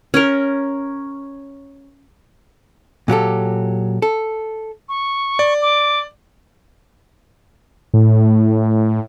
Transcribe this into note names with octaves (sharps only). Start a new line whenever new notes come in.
C#4 A#4
A#2 F#3 G4 A4
A4
C#6
D5
D6
A2